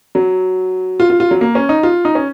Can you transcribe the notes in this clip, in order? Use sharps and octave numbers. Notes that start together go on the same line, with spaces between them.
F#3
F4
F4
F4
F#3
A#3
C#4
D#4
F4
D#4
C#4